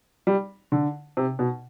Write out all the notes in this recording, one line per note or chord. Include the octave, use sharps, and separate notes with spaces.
G3
D3
C3
B2